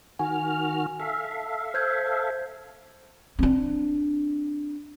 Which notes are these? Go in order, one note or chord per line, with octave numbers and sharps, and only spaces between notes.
D#3 F#4 G#5 F6
A4 E5 F5
C5 G6 G#6
C4 D4